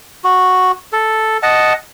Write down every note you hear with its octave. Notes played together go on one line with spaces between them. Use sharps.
F#4
A4
D#5 F#5 A5